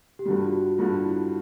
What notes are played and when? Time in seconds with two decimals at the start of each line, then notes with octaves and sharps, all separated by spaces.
0.19 G4
0.26 G2 D3 G3 F#4
0.45 F4
0.52 F#4
0.78 G2 D3 G3 F4
1.05 E4